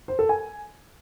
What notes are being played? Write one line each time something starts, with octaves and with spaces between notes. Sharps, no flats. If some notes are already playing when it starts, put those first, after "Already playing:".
C5
A4
G#5